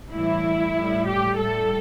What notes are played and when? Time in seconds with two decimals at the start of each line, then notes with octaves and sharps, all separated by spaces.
0.13 A2 E3 G3 E4
0.75 A2 G3
1.07 G4
1.37 A2 G3 A4